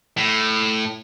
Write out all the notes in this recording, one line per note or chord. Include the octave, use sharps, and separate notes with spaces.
A2